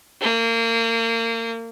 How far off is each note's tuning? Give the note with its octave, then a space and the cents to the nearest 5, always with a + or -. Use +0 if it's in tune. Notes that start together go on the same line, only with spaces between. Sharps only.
A#3 -30